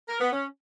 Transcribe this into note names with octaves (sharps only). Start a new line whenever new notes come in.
A#4
B3
C#4